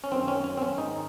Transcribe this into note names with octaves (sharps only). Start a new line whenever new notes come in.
C#4
F#2 D#3 C4
C#4
C#4
C4
C#4
G#2 D#3 D#4